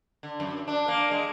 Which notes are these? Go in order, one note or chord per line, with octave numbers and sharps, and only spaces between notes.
D3
F#2
D4
A#3
G#3